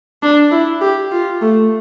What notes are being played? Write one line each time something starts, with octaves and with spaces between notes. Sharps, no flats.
D4
E4
G4
F4
A3